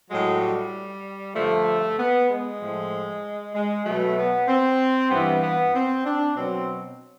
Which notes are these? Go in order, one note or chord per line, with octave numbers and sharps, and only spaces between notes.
A2 F#3 G#3
G3
G2 D3 F3 A3
B3
G#3
A2 F3
G#3
B2 F#3 A3
B3
C4
G2 E3 B3
B3
C4
D4
B2 F#3 C4